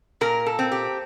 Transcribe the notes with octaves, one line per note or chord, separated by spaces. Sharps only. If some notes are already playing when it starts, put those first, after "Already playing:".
A#2 A#4
A4
C4
G4